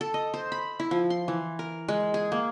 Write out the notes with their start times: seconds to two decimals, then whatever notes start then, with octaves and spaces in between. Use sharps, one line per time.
0.01 A4
0.14 D#5
0.34 C5
0.52 B5
0.80 E4
0.91 F3
1.10 C6
1.28 E3
1.59 A#4
1.88 G#3
2.14 G#4
2.32 A#3